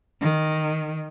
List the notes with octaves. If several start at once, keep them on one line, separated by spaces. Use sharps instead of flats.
D#3